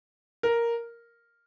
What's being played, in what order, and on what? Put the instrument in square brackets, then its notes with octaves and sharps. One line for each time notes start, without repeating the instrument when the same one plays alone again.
[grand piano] A#4